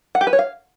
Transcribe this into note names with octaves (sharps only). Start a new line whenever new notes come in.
F#5
G4
B4
C#5
F5